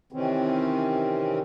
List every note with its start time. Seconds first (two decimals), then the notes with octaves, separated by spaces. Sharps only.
0.12 C3 D#3 E3 C4 C#4